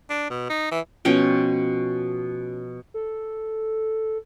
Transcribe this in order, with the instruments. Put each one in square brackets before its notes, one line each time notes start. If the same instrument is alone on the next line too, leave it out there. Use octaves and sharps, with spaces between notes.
[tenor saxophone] D4
B2
D#4
E3
[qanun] B2 F3 C#4 G5
[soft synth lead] A4